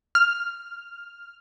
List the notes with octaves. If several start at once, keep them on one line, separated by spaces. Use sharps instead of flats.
F6